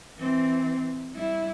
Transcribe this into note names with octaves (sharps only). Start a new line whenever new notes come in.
E3 C4
G3 E4